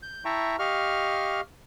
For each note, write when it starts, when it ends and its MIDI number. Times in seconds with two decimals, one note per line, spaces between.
0.03 0.24 91
0.25 0.56 64
0.25 0.56 76
0.25 0.56 79
0.25 0.56 81
0.25 0.56 82
0.25 0.56 85
0.59 1.41 67
0.59 1.41 75
0.59 1.41 77
0.59 1.41 85
0.59 1.41 89